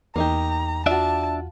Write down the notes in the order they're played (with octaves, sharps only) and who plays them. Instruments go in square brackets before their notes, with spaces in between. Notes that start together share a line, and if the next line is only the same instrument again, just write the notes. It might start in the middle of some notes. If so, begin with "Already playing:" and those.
[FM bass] E2 [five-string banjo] A#3 D#4 G4 [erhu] A#5
[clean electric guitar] D4 D5 E5 [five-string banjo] F4 F#4 [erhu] A5